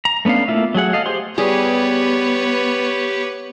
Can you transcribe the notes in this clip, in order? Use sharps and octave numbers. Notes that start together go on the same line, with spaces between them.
A#5
A3 B3 C#4 D4 F5
A3 A#3 E4 F4 E5
F#3 A3 G#4 F#5
A4 D#5 F5
G4 G#4 C5 C6
G3 B3 G4 G#4 B4 C#5